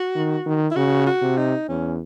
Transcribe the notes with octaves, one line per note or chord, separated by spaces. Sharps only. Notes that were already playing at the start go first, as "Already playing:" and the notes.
Already playing: F#4
D#3
D#3
E4
C#3 F#4
F#4
C3
D#4
E2 C#4